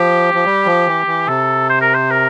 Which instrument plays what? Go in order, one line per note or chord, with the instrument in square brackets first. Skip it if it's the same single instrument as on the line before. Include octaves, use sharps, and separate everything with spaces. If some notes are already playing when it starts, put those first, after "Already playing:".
Already playing: [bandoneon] F3 [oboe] G4
[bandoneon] F3
G3
F3
E3
E3
[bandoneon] C3 [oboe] A4
[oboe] C5
A#4
C5
A#4